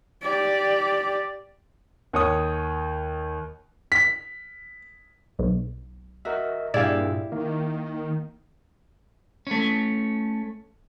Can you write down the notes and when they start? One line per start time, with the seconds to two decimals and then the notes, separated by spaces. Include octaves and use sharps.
0.23 G4 D5
2.13 D#2 C#5 D#6
3.92 B6
5.39 B1
6.25 F#4 A#4 D#5 E5
6.74 G2 A#2 E4 G4 G#4 D5 F5 E6
7.32 D#3 A#3
9.47 A3 C#4